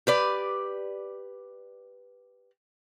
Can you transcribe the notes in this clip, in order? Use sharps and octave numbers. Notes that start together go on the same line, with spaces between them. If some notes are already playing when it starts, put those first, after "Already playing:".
G4 B4 D5